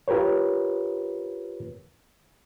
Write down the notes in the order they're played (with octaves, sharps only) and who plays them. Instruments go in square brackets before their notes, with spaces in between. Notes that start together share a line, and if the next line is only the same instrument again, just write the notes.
[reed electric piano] F4 G4 A#4 B4 C#5